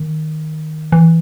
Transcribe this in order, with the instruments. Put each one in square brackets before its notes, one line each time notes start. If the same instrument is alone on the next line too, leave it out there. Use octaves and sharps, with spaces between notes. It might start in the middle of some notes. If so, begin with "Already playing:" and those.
Already playing: [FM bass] D#3
E3